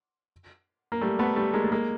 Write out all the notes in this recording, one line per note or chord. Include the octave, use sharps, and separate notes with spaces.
A#3
G3 A3
A3 B3
G3 A3
G#3 A#3
A3
G#3 A#3